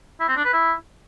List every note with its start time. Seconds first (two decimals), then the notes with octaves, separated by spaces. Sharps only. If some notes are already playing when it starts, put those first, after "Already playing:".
0.20 E4
0.28 C4
0.37 D4
0.45 B4
0.53 E4